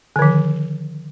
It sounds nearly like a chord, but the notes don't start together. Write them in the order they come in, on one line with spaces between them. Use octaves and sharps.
D3 D#3 F3